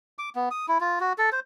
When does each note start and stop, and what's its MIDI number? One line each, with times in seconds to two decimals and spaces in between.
0.19 0.30 86
0.35 0.49 59
0.51 0.66 87
0.68 0.78 64
0.81 0.99 65
1.00 1.13 66
1.18 1.30 69
1.32 1.40 72